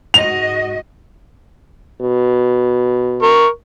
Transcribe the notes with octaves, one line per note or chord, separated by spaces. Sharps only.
G#2 F#4 D#5 F7
B2
A#4 C#6